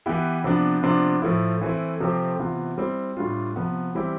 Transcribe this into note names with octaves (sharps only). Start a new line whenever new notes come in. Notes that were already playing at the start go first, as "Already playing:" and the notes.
E3 B3 E4 G4
C3 F3 B3 D4
C3 F3 B3 D4 F4
A2 F3 A3 E4
E3 A3 C4 E4
C3 F3 A3 C4 G4
C3 E3 B3 F4
G3 C4 E4
A2 G3 D4 F4
C3 F3 B3
E3 G3 C4 E4 G4